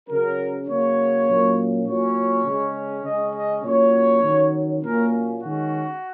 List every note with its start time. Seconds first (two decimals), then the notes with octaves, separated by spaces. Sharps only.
0.09 C#3 F#3 C#4 A#4
0.68 C#3 F#3 A#3 C#5
1.28 A#2 F#3 A#3 C#4
1.86 A#2 F#3 C#4 C#5
2.45 C#3 G#3 C#4
3.05 C#3 G#3 C#4 D#5
3.35 D#5
3.64 A#2 F#3 C#4 C#5
4.23 D#3 F#3 C#4
4.83 A#2 F#3 A#3 C#4 A#4
5.41 D#3 G#3 C#4 F#4